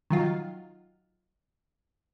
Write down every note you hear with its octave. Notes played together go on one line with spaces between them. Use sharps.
D#3 F#3 F4